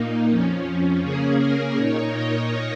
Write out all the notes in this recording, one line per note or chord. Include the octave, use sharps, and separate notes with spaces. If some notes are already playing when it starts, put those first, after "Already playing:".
Already playing: A#2 A#3 D#4
F2 F3 C#4
C#3 A#3 C#4 G#4
A#4
A#2 A#3 D#4 C#5
D#5